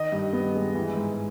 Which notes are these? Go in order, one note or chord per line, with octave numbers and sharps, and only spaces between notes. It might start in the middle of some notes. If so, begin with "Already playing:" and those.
Already playing: D#3 D#5
G2
B3
G#3
E3
G#2